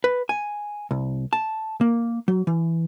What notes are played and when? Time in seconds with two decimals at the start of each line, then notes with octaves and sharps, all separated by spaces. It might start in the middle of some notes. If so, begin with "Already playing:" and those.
0.04 B4
0.29 G#5
0.91 C2
1.33 A5
1.81 A#3
2.28 F#3
2.47 E3